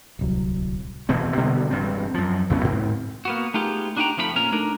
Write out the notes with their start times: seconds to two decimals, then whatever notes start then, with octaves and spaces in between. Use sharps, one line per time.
0.19 D1 C2 F#3
1.09 D#1 B2 E3 C4
1.37 B2 D3 G3 B3
1.70 E1 G2 C4
2.14 F#2 F3
2.50 C#2 F#2 B3 C#4
2.64 G#2 C4
3.25 A#3 B3 F#4
3.54 A3 B3 D#4 F4 G4 G#4
3.97 D4 D#4 F#4 G4 G5 A#5
4.17 F2 F3 A3 F4 B5
4.36 A#2 C#4 A#4 A#5
4.52 A3 D4 D#4 A#4